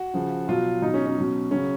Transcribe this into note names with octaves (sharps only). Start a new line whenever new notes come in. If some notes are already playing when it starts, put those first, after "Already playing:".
Already playing: F#4
C#3 F3
B2 F#3 F4
B2 F#3 D#4
C#4
C#4
B2 F#3
C#3 F#3 C#4